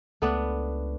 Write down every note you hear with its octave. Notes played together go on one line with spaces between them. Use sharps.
C#2 A3 B3 D4